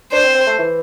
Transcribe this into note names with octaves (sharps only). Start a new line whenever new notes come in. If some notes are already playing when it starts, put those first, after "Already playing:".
D4 C5
C4
C4
A3
E3